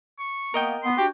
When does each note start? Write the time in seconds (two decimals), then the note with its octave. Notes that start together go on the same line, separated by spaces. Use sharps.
0.19 C#6
0.54 A#3 B3 A#4 D#5 G5
0.83 B3 C6
0.98 D4 F#4 G4